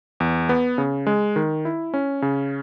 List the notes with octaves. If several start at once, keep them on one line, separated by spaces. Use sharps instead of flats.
E2
B3
C#3
G#3
D#3
E4
C#4
C#3